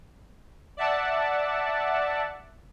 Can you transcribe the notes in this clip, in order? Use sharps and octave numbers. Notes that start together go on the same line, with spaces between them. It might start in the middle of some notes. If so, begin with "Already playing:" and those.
D5 E5 F#5 A5